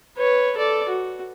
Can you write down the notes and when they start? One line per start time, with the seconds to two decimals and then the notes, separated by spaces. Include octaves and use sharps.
0.17 B4 C#5
0.57 A4 D5
0.88 F#4